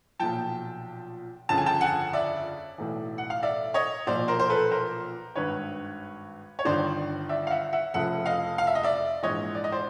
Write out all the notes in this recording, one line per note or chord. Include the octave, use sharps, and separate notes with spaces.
B1 A#2 F3 G5 A5
G1 F2 C#3 A5
G#5
G5 A5
F#5 G#5
D5 E5
B1 A2 E3
F#5
F5
D5 E5
C#5 D#5
B1 A#2 F3 C5 D5
A#4 C5
C5
A4 B4
A#4 C5
G#1 G2 D#3 B4 C#5
C#5
G1 G2 D#3 C5 D5
D5 E5
F5
E5 F#5
E5 F#5
F1 F2 C#3 F3 E5 F#5
D#5 F5
F5
E5
D#5
D5 E5
A#1 G#2 E3 C#5 D#5
D5
D#5
C5 D5